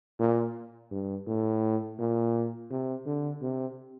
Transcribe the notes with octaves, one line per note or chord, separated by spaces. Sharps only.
A#2
G2
A2
A#2
C3
D3
C3